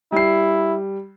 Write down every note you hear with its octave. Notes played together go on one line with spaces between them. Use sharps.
G3 E4 C7